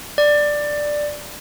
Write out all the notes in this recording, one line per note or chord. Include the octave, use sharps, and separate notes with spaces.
D5